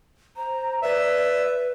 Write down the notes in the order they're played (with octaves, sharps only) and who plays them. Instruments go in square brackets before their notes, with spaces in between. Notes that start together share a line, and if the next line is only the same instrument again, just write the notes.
[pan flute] C5 [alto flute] A#5
[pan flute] B4 [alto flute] D5 [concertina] E5